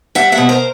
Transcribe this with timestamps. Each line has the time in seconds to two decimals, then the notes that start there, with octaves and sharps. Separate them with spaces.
0.15 G3 E5 F#5
0.32 E5 F#5
0.38 B2
0.49 A#4 C5